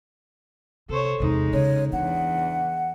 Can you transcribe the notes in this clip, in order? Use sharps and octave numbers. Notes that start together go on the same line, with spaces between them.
C3 A4 C5 C#5
E2 C3 G#3 D#4
C#3 C#5
E2 D4 F#5